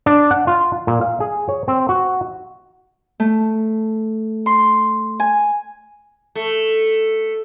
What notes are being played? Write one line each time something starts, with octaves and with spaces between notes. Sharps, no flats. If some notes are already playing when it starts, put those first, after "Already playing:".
D4
F#5
F4
A#2
F5
G#4
C#5
C4
F#4
A3
C6
G#5
A3